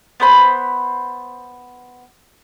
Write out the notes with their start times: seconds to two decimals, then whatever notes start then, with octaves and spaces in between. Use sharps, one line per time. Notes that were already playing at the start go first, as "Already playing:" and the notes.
0.20 B3 C5 B5